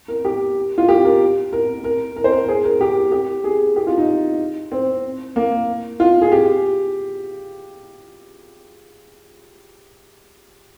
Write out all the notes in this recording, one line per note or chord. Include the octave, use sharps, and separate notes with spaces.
A#4
G4
F4
G4
A#4
A#4
A#4
A#4
C5
A#4
G#4
A#4
G4
G4
G#4
G4
F4
D#4
C4
A#3
F4
G#4
G4